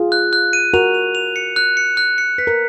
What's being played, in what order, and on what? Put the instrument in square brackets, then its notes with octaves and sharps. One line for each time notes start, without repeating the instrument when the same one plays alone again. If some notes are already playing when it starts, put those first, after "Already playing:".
Already playing: [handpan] F4 G#4
[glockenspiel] F#6
F#6
D#7
[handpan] F#4 A#4 [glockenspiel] F7
[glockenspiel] F7
F7
C#7
F#6
C#7
F#6
C#7
[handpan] B4 [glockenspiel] B6
[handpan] A#4